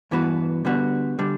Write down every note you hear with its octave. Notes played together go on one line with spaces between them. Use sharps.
G2 E3 B3 F#4 B4
D3 G3 B3 F#4
D3 G3 D4